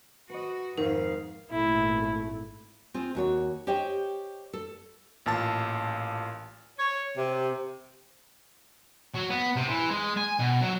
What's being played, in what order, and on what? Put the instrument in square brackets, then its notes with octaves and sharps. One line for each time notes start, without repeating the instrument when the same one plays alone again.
[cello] F#4 [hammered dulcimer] B4 D#5
[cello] F2 F5 [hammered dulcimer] G#2 [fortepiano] D#3 [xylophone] A#4
[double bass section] G#1 A#2 A3 [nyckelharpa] E4
[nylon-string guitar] C4 F4 G#4
D#2 F#4 C#5
G4 C5 C#5 D#5 G5
A4
[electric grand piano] A1 A#2 A5 A6
[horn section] C#5
C3
[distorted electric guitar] F#3
B3
C3
E3
G#3
G#5
B2
F#3